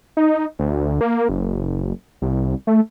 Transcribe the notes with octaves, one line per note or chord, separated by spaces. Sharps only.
D#4
D2
A#3
F#1
C2
A3